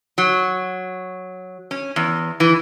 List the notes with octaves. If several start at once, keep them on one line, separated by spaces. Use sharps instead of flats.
F#3
C#4
E2
E3